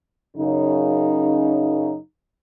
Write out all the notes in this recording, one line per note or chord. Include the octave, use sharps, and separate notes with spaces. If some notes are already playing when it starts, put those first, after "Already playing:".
F#2 C#3 D#4